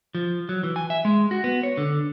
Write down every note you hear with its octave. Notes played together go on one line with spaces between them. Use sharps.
F3
F#3
E3
G#5
E5
G#3
F#4
B3
C#5
D3